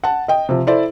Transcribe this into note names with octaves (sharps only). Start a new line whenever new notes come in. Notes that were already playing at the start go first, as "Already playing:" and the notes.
F#5 A5
D#5 G5
C3 F3
E4 A4 C5 D5